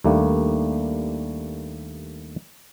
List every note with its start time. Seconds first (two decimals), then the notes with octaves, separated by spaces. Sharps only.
0.04 D#2 G3 A3 A#3 D4